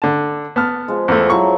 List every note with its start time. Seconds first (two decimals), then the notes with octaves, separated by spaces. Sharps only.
0.02 D3 A5
0.56 B3 A5 F6
0.88 F3 G#3
1.08 E2 A3
1.30 F3 F#3 E4 C#6